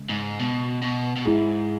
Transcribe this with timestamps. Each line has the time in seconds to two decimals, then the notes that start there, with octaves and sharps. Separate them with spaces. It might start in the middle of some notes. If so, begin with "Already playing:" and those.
Already playing: C#3 G#3 C#4
0.09 G#2
0.39 B2
0.82 B2
1.16 B2
1.26 G#2 G#3 E4 G#4